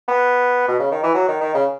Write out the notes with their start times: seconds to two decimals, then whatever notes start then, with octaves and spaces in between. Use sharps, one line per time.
0.08 B3
0.68 B2
0.79 C#3
0.91 D#3
1.03 E3
1.15 F#3
1.28 D#3
1.41 D#3
1.55 C#3